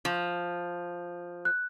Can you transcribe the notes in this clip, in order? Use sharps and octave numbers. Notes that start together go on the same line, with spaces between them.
F3
F#6